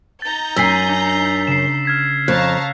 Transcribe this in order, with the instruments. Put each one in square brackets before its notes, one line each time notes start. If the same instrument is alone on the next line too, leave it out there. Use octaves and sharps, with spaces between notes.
[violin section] D#4 A#5 G6 [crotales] A6
[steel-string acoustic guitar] F#2 G#5 [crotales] E6 B6 C7
[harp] D4
[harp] C#3 [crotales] C7 E7
[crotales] F6 G#6 B6
[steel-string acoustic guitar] F2 [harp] C#5 [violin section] F5 A5 A#5 [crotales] F#6